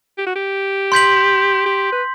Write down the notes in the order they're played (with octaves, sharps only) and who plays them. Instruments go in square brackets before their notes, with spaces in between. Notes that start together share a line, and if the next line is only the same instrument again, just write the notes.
[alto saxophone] G4
F#4
G4
[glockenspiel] C6 G6 B6 F#7
[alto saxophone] G4
B4